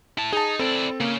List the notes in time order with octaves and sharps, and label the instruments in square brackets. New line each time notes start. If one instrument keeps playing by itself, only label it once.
[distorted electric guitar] E4 A5
[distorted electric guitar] D#4 [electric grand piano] G#4 A5
[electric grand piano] C4 A4 [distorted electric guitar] E4 D5
[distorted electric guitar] C#3 C#4 [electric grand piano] A#3